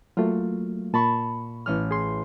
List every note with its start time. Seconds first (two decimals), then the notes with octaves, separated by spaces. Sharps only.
0.17 F#3 A3 A#3 F4
0.94 A#2 A5 B5 C#6
1.66 A1 C#4 F6
1.91 G#4 C6